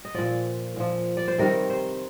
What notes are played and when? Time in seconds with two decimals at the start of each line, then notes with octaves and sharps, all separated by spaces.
0.05 D#5
0.14 A#2 F3 D5
0.76 A#2 F3
1.17 D5
1.28 C5
1.38 C3 D#3 G3 A#4
1.70 C5